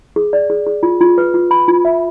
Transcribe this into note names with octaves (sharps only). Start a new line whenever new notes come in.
G#4
D5
G#4
G#4
F4
F4
B4
F4
B5
F4
E5